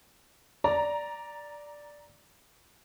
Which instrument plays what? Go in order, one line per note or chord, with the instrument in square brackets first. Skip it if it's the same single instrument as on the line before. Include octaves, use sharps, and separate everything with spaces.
[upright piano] D5 [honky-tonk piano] A#5